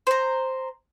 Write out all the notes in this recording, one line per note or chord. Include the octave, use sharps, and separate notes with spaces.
C5 A#5